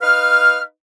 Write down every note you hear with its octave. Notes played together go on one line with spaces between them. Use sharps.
D#4 B4 F5 F6